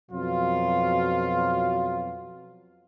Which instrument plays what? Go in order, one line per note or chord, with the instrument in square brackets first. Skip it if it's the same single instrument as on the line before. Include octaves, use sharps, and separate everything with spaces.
[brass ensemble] F2 B2 F#3 F4